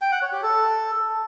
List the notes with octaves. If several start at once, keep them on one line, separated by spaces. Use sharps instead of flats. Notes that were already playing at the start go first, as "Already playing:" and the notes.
G5
F#5
C#5
G4
A4